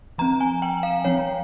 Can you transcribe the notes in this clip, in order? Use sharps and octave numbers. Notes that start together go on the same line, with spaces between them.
F3 C4 A#5
G#5
G5
F5
F3 C4 C#5